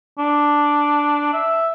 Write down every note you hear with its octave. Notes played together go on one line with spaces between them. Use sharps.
D4
E5